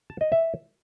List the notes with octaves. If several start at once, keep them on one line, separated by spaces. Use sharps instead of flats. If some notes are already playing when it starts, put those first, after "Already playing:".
A5
D#5
E5